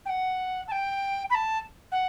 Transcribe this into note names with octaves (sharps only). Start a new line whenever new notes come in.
G5
F#5
A5
G5
B5
A5
F#5